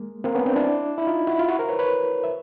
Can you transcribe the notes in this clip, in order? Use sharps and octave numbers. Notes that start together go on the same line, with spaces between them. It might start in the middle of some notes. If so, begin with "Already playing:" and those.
Already playing: G#3 A#3
A#3 C4
B3 C#4
C4 D4
D4 E4
E4
D#4 F4
E4 F#4
F4
E4 F#4
A#4 C5
B4 C#5
B4 C#5
E5